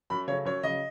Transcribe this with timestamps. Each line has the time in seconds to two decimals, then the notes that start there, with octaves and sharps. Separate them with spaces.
0.10 F#2 B5
0.28 C#3 F#3 A3 C#4 C#5
0.45 F#2 C#5
0.63 C#3 F#3 D#5